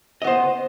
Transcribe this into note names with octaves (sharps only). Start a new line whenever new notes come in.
B3 C5 D#5